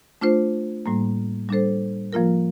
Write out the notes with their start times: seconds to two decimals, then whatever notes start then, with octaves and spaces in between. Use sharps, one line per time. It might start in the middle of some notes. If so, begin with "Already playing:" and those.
0.21 A3 D4 F4 C5
0.86 A2 G3 A#3
1.49 G3 D4 A4 C5
2.13 F3 A#3 F4 A#4